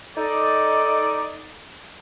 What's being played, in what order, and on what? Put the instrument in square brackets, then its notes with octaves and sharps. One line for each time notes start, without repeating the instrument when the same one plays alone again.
[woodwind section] D#4 A4 D5